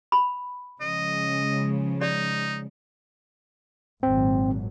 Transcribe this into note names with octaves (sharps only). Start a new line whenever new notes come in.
B5
C#3 F3 G#3 D#5
D#4 D5
G#1 A#2 F#3 C4